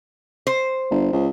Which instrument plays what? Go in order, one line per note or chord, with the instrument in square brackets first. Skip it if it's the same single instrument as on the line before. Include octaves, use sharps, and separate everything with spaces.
[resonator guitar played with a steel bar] C5
[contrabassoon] G1
C#2